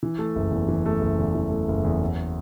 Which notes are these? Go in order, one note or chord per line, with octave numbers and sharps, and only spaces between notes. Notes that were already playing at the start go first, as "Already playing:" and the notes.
E3
A3
F#1
E2
E3
A3
F#1
E2
E3
A3
F#1
E2
F#3